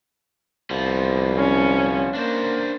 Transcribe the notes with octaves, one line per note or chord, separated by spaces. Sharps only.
C2 F3 B3
C#4
A#3 D4 C5